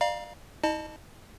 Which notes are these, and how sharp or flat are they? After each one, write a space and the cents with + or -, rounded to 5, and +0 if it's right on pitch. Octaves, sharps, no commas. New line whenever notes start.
D5 +35 F5 +0 A#5 +30
D#4 +45 D#5 -30 A5 +0